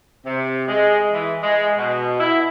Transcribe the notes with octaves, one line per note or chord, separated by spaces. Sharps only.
C3
G#3
E3
G#3
B2
E4